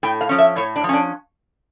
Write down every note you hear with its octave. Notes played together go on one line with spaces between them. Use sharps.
A2 G5
F5
F3 C#4
E5
A2 C#5
D4
F3
C#4 D4